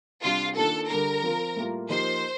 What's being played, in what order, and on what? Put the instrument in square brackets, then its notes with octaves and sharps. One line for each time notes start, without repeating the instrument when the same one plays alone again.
[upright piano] C3 G3 D4 G4 [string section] F4
[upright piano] D#3 A#3 D4 F4 [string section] A4
[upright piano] D3 G3 D4 [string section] A#4
[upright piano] F3 C4 F4
A2 G3 A#3 F4
[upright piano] F3 A#3 D#4 G4 [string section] C5